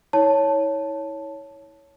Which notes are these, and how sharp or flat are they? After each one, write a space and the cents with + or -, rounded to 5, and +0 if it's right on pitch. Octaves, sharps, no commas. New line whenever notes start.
E4 -35 C#5 +5 A5 +0